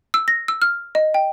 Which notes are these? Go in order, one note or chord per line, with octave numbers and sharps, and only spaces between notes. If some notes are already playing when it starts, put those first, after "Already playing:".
E6
A#6
E6
F6
D#5
G5